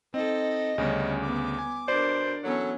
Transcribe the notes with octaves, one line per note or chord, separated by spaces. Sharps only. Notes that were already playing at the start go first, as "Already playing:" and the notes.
C4 D#4 A4 D#5
D2 C#3 G3 B3 C#4
B3 D6
G#5
B2 D4 A#4 C5 D5
E3 F#3 B3 C#4 A4